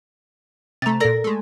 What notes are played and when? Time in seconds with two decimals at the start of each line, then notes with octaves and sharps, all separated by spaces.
0.82 C3 A3 A#5 A6
1.00 A#2 A4 A#4 D5 A#6
1.24 G#3 A3